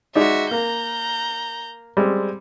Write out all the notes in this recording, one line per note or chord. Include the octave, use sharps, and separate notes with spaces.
G#3 D#4 F#4 D5 E5
A#3 A#5 G6
G3 G#3 C4